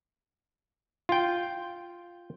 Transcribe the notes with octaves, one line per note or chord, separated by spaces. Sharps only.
F4 G5